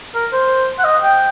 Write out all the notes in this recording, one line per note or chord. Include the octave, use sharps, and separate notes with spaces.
A#4
C5
F#5
D#5
G5